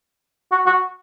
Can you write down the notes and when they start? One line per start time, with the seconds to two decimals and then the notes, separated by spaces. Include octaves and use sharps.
0.52 F#4
0.66 F#4